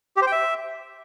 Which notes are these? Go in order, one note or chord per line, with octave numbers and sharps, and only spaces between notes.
G4
C5
G5
E5